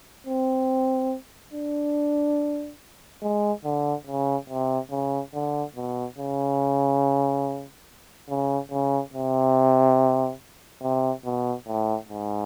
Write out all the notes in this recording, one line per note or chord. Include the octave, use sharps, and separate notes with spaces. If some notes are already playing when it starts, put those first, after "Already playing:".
C4
D4
G#3
D3
C#3
C3
C#3
D3
B2
C#3
C#3
C#3
C3
C3
B2
A2
G#2